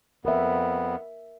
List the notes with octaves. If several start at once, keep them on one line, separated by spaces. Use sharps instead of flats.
F2 B3 A#4 E5